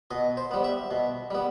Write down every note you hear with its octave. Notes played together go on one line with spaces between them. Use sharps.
B2 D#5
C5
G3 B3
E5
B2
G3 B3